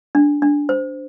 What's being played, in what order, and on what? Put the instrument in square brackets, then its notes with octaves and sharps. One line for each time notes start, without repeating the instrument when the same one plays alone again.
[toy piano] D4
D4
C5